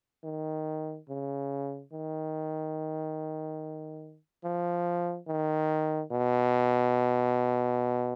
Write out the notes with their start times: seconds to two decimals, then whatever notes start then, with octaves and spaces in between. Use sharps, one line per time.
0.24 D#3
1.09 C#3
1.93 D#3
4.44 F3
5.28 D#3
6.11 B2